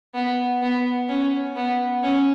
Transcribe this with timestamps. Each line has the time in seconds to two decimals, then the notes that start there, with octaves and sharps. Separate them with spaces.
0.14 B3
0.62 B3
1.08 C#4
1.56 B3
2.03 C#4